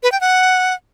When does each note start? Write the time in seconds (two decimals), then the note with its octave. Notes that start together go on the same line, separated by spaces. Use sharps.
0.03 B4
0.12 G5
0.21 F#5